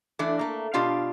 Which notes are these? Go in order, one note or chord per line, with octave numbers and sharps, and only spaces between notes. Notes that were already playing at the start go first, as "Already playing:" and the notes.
E3 A3 D4 D5
A3 A#3
B2 D4 F4 G4 F5